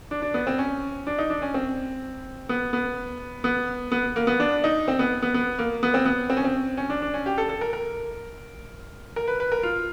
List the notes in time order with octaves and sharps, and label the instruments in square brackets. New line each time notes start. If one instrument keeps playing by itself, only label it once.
[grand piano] D4
D4
B3
C4
C#4
D4
D#4
D4
C#4
C4
B3
B3
B3
B3
A#3
B3
D4
D#4
C4
B3
B3
B3
A#3
B3
C4
B3
C4
C#4
C4
C#4
D4
D4
C#4
G4
A4
A4
A#4
A#4
A#4
B4
B4
A#4
F4